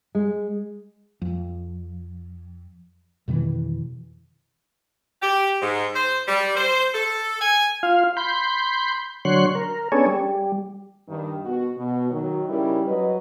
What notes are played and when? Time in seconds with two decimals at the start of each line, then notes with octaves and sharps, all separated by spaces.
0.15 G#3
1.22 F2
3.28 F2 B2 D#3 E3
5.22 G4
5.62 G#2
5.95 C5
6.28 G3
6.56 C5
6.94 A4
7.41 G#5
7.83 F4 F5
8.17 B5 C6 G6
9.25 D3 F#3 C#5 C6 F#6
9.55 A#4
9.92 B3 C#4 D4 G#4 A4 C#5
10.06 G3
11.08 G2 D#3
11.44 B2 F#4
11.76 B2
12.11 D#3 F#3
12.49 C#3 G3 D#4 E4 A#4
12.87 F#3 B4 D#5